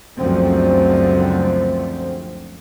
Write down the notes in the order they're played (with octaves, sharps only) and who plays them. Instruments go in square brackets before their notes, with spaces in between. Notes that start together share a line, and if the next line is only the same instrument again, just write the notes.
[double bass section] C#2 F#2 D3 F3 A3 C4